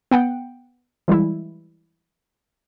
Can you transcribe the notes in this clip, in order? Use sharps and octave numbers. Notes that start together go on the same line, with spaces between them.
B3 F#5 G5
E3 G3 G#3 E4